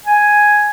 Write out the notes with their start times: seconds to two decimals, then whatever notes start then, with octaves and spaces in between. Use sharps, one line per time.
0.06 G#5